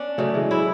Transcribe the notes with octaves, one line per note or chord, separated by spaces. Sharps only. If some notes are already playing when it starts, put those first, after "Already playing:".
Already playing: B3 C#4 D4
C#3 F#3 A3
E3 G#3
F#3 E4